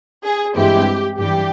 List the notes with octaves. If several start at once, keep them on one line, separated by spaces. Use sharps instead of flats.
G#4
G2 E3 G#3 C4 E4 G4
G2 E3 G3 G4